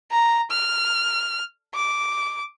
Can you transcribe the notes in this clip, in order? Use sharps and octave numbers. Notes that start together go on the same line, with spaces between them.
A#5
F6
D6